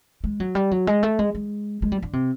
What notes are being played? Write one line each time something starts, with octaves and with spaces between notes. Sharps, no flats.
G#3
F#3
G3
F#3
G#3
A3
G#3
G#3
G#3
G3
D3
C3